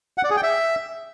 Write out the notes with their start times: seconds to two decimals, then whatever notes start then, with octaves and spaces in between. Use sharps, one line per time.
0.18 F#5
0.24 D5
0.30 G#4
0.37 G5
0.43 E5